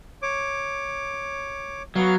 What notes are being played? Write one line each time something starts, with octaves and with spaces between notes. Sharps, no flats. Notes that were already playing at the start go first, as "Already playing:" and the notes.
C#5 D6
F#3 B3 F5 F6